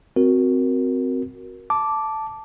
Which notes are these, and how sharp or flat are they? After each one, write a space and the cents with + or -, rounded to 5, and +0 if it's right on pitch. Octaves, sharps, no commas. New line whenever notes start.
C4 -10 F#4 +0 A#4 +10
A5 +0 D6 -5